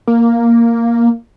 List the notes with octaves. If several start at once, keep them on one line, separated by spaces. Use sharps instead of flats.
A#3